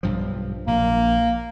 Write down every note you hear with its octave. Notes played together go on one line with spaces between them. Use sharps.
B1 G2 F3
A#1 A#3